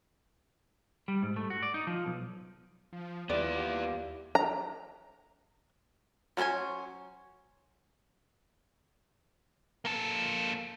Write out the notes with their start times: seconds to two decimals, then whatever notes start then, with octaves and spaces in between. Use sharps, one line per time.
1.08 G3
1.22 G#2
1.36 A3
1.50 F#4
1.63 D5
1.74 D#4
1.87 F3
2.06 B1
2.93 F3
3.30 D#2 G3 B3 E4 F4 G4 D5
4.35 A#5
6.37 F#3 G3 C#4 C5 G#5
9.85 A#3 A4